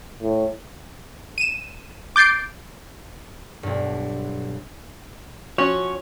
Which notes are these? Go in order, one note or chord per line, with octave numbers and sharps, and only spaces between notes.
A2
D#7 E7
D6 G6 A6 C7 D7
B1 G2
F3 C#4 F#4 C#5